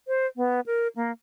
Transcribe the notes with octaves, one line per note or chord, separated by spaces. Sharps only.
C5
B3
A#4
A#3